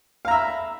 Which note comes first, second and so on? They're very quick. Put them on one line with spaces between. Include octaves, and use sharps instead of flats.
F5 A#5 E5 B5